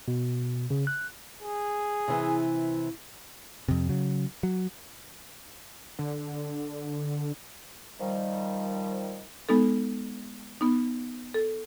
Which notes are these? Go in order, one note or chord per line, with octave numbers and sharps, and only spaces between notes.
B2
C#3
F#6
G#4
C3 E3
F2 C3
C#3 F#3
F#3
D3
D#3 F3 G3
G#3 B3 D#4 A4
B3 D#4
A4